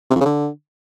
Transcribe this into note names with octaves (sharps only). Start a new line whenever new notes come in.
C3
F2
C#3
D3